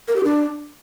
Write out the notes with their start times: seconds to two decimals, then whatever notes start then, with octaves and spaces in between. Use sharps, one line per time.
0.08 A#4
0.16 G4
0.24 D4